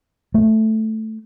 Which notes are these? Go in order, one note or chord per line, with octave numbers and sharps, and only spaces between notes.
A3